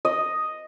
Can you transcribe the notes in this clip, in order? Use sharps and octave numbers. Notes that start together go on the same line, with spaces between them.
D#5